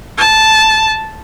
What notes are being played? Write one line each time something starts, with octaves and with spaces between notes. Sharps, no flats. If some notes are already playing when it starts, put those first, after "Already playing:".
A5